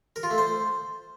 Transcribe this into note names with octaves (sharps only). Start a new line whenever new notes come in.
A#4
F4
A3
C5